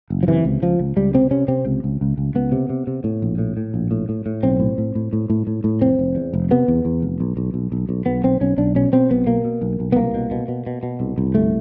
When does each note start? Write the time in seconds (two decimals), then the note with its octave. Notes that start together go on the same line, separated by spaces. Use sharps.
0.10 F#1
0.23 F3
0.28 C3 E3
0.45 C#2
0.62 C#2 F3
0.80 C#2
0.97 C#2 G3
1.14 C3 C4
1.31 C3 C#4
1.48 C3 C4
1.65 C#2
1.84 C#2
2.01 C#2
2.18 C#2
2.35 C#2 B3
2.52 C3
2.70 C3
2.87 C3
3.04 A2
3.22 A#1
3.38 A2
3.57 A2
3.74 A#1
3.91 A2
4.09 A2
4.26 A2
4.43 B1 C4
4.60 A2
4.78 A2
4.95 A2
5.13 A2
5.30 A2
5.47 A2
5.64 A2
5.81 F1 C4
5.99 F1
6.15 E2
6.33 F1
6.51 C3 B3
6.68 E2
6.85 E2
7.02 F1
7.20 B1
7.37 B1
7.54 B1
7.72 B1
7.89 B1
8.06 B1 B3
8.24 B1 C4
8.41 B1 C#4
8.58 B1 D4
8.75 B2 C#4
8.93 B2 C4
9.10 B1 B3
9.27 B2 A#3
9.45 B2
9.62 B1
9.80 B1
9.92 B3
9.96 C2 A#3
10.14 B2
10.31 B2
10.48 B2
10.67 B2
10.83 B2
11.00 C2
11.18 C2
11.35 G1 A3